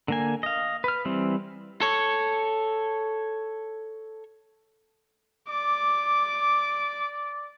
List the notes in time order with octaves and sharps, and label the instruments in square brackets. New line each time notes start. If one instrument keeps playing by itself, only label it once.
[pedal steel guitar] D3 A#3 G#5
D#5 F5
B4 F6
E3 G3 C4
[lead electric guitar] A4 C#5
[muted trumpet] D5 [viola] D6